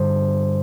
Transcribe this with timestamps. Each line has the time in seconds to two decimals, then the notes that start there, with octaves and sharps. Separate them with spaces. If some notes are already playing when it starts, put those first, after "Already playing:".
Already playing: G2 D3 G3 C5